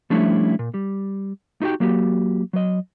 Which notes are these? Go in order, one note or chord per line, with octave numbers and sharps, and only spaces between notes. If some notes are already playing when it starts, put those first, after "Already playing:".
F3 G3 A3 C#4 D4 E4
A#2
G3
D#4 E4 F#4 G4 G5
F#3 A#3 F#4 G4
F#3 D#5